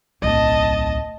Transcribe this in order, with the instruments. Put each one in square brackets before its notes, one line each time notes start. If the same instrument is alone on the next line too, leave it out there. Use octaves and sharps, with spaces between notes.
[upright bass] D1 B1 [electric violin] D#5 A5